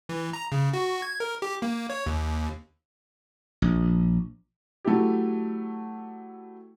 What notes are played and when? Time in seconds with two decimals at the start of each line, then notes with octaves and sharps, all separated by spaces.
0.09 E3
0.33 A#5
0.52 C#3
0.73 F#4
1.02 G#6
1.20 A#4
1.42 G4
1.62 A#3
1.90 C#5
2.06 D#2
3.62 A#1
4.85 F#3 A3 E4 G4